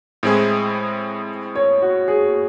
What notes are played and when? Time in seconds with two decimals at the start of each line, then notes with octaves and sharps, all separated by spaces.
0.23 A2 G#3 C4 E4 G#4
1.55 C#5
1.82 F#4
2.08 G#4